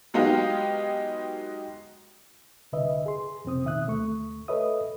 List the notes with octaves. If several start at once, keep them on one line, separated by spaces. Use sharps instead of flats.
F#3 G#3 B3 D#4 G4 F5
C2 D3 B4 D#5 E5
G#4 C6
F2 C3 C4 D#6
B2 D#3 E5 D#6 F#6
D2 A3 C#6
A4 B4 C#5 D#5 E5 D#6